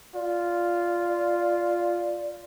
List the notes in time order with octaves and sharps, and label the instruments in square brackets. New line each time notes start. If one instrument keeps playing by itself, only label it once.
[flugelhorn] F4 [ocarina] D5